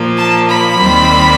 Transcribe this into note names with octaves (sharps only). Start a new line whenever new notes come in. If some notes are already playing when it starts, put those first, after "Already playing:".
Already playing: A#2 F3 A#3
A5
B5
D#2 D#3 G3 C4